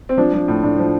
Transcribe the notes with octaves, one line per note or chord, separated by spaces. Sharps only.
C4
F3 D4
F3
A2
A2 D4
F3